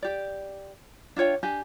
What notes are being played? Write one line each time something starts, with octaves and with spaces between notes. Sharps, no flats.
G4 D5
D4 F4 C#5 G5
D4 G4 G#5